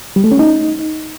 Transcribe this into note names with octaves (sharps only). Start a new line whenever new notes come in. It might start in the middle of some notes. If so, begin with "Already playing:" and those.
G3
A3
C#4
D#4